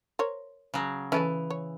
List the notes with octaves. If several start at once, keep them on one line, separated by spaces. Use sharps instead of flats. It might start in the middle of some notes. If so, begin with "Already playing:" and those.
A#4 C5 C#5
C#3 F#3
E3 C#4 A4 B4
C#5